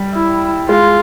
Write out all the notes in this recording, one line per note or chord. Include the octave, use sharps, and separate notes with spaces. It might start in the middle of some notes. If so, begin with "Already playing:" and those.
Already playing: G3
E4
G#3 F4